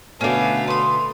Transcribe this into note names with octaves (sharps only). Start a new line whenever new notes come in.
B2 D3 A3 B3 C#4 D4 F#4 F5
B4 C6 D#6